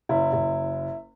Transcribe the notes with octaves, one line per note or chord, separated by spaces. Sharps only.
F#1 E4
F#1